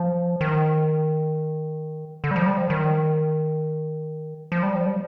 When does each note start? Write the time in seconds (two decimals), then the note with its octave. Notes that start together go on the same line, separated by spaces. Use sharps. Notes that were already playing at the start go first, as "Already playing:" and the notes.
Already playing: F3
0.41 D#3
2.24 D3
2.31 G3
2.36 F3
2.46 G3
2.57 F3
2.70 D#3
4.52 F3
4.63 G3
4.75 F3
4.86 G3